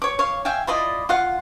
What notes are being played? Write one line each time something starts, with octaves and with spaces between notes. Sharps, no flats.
C#5 D6
C#5 F5
E5 F5 G5 G#5
E4 F4 D5 D#5
F4 F5 F#5